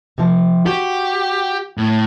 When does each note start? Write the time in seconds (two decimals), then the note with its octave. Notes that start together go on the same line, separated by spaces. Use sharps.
0.18 C3 F3
0.66 F#4 G4
1.78 A2